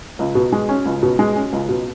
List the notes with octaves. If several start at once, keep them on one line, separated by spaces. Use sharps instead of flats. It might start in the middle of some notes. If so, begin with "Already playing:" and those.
C#2
B2
G#3
C#4
C#2
B2
G#3
C#4
C#2
B2